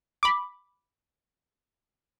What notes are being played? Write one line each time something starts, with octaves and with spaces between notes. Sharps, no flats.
B5 D6